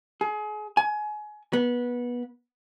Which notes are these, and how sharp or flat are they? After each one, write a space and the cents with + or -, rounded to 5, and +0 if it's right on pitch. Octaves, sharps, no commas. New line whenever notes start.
G#4 +30
G#5 +25
B3 -20